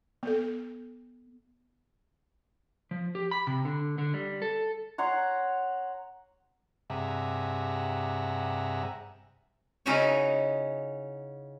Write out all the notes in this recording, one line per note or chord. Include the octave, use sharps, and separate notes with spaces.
B3 A4
F3
G4
B5
C3
D3
D3
G3
A4
C#5 F#5 A#5 C6
G2 C3 G#4 E5 F#5 A#5
C#3 C#4 D#4 E4 F#4 C#5